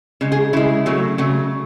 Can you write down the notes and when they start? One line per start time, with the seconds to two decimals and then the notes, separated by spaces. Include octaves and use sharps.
0.21 C#3 G#3
0.32 G#4
0.53 C#3 G#3 E4
0.86 C#3 F#3 A3
1.18 C#3 F#3 A3